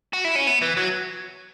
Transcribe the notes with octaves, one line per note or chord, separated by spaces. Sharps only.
F#4
E4
C#4
B3
E3
F#3